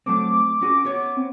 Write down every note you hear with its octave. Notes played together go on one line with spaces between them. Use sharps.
F#3 A3 C4 D6
C#4 F#4 G#4
B3 C#5
C4